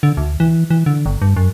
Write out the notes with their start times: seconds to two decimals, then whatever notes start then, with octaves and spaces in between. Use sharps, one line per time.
0.03 D3
0.17 D2
0.40 E3
0.70 E3
0.86 D3
1.06 G1
1.22 G2
1.37 F#2